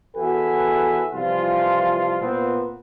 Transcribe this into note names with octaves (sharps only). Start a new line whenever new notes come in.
E2 F#4 A4 B4 E5 G#5
C2 E3 F3 F4
A#2 B3 C4